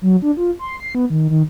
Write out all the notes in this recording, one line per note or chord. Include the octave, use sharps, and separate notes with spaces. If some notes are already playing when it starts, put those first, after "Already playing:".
F#3
D4
F4
C6
C7
B3
D#3
D#3